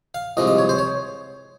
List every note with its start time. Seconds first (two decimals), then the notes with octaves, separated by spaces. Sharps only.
0.15 F5
0.37 C2 A#2 F3 G#3 D#5
0.47 D#5
0.58 C#5
0.69 C5
0.79 C#5